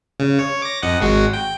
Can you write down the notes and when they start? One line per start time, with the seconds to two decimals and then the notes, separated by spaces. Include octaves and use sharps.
0.20 C#3
0.39 C#5
0.62 D6 A#6
0.82 F2 D#5 F#5
1.00 G#1 G#3 F#4
1.33 G5